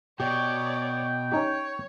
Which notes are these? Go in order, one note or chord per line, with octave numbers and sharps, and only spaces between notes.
B2 G4 C#5 D5 G5
C#4 D#4 G4 C#5